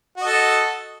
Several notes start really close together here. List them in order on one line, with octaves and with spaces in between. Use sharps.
F#4 D#5 A4